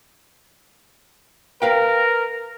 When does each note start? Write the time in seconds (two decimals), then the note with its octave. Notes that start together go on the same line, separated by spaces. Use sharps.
1.62 A#4 B4 F5 G5